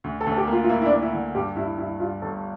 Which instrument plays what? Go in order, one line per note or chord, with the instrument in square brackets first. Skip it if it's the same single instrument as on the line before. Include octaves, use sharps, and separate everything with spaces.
[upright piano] D2
[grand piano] A4
[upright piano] D2
[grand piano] A4
G4
[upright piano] A#3
[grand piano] F4
F4
[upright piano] A#3 [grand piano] E4
[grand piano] E4
D4
[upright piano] A#3
[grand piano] E4
[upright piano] D3
[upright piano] G2 [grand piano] G4
[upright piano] G2 [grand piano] E4
[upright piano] G2 [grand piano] E4
[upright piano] G2 [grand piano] F4
[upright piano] G1 [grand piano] A4